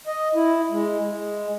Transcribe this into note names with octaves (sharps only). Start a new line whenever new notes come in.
D#5
E4
G#3
G#3